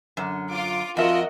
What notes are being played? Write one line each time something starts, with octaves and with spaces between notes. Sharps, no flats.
F#2 D3
F4 D6
F2 F4 F#4 A#4 D#5 E5